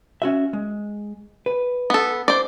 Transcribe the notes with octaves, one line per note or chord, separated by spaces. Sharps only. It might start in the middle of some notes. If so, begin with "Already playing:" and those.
C#4 F#4 E5
G#3
B4
B3 A4
C5 D5